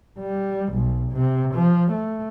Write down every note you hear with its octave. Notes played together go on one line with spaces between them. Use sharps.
G3
B1
C3
F3
A3